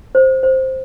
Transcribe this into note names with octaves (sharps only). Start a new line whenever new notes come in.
C5
C5